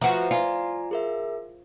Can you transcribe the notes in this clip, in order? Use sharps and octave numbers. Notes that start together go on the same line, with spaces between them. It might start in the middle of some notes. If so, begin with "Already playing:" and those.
F3 F#4 B4 E5 A#5
F4 D5 G#5 A#5
G#4 A#4 E5